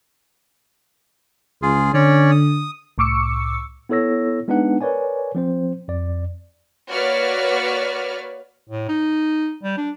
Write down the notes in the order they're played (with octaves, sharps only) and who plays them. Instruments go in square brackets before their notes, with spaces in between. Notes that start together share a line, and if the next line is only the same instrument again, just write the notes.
[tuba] C#2 [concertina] F4 G#4
[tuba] D3 [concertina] C#4 C#5 D5
[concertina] D#6
[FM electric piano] C2 A2 C#6 D6 E6 C#7
[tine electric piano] B3 E4 A4 C#5 E6 A#6
G#3 B3 D4 D#4 B4 F#5
A#4 B4 C#5 D5 G#5
F3 C4 C5
F2 D5
[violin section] A#3 F#4 B4 C#5 D5 F6
[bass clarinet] A2
D#4
G3
D4